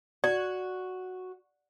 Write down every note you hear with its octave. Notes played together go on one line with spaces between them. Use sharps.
F#4 D5